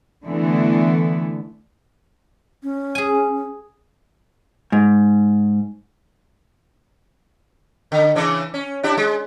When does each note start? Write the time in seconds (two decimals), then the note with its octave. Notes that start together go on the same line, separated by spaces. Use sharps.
0.25 D3 E3 A3 B3 E4
2.63 C#4
2.95 G#4 G#5
4.72 G#2
7.92 D3
8.15 C#3 E3 D4
8.54 C#4
8.83 D4 E4 G4
8.97 G#3